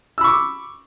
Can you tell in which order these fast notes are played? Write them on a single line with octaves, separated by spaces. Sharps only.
E6 B5 C#6 D6